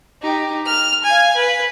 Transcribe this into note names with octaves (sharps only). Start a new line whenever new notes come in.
D#4 G4
F6
F5 G#5
B4